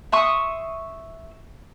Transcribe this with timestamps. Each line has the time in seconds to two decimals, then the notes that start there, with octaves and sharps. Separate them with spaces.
0.12 E5 C6 C#6 D#6